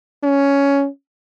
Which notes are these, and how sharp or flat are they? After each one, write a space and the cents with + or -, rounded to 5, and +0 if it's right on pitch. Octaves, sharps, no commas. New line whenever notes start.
C#4 +10